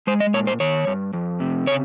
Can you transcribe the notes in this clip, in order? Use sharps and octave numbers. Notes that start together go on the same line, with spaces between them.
G#3 C5
D#5
A#2 C#5
C5
D#3 C#5
G2
F2
C3
C#3 C#5